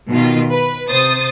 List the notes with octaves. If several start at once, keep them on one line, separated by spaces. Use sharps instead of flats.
B2 D#3 F4
B4
C3 C5 D#6 A6